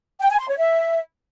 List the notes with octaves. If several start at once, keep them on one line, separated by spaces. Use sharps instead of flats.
G5
G#5
C6
C#5
E5